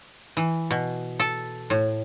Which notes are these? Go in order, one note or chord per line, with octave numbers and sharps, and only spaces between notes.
E3
B2
A4
A2